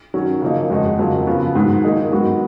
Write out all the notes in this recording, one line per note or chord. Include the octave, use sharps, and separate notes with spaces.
D#3 F#3 C#4 F#4
C#3 F3 A#3 D#4
F2 D#3 G#3 D#4 F#4
F2 C#3 F#3 A#3 F4
C#3 F3 B3 F#4
G#2 D#3 F#3
D#3 A#3 D#4 G#4
G#2 D#3 F#3 B3 F#4